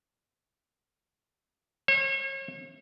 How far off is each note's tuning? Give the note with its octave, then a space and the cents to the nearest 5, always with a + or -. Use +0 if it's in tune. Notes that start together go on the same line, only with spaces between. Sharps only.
C#5 -40